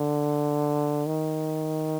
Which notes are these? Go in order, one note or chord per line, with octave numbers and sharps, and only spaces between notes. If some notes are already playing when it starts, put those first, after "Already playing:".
Already playing: D3
D#3